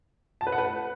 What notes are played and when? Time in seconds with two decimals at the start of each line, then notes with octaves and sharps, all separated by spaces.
0.41 A5
0.47 B4
0.52 F#5
0.58 B4